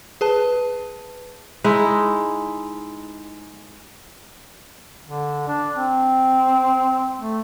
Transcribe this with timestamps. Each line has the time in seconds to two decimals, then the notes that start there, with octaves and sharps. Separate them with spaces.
0.21 G#4 B4 A5
1.64 G#3 D#4 E4
5.09 D3
5.48 D4
5.76 C4
7.21 A3